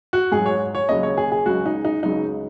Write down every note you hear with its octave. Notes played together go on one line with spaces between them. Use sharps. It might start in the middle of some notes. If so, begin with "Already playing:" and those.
F#4
G#2 F#3 G#4
C#5
C#5
D#2 C#3 F#3 D#5
C#5
G#4
G#4
C#2 C#3 F#3 F#4
D#4
D#4
C#2 C#3 F#3 D#4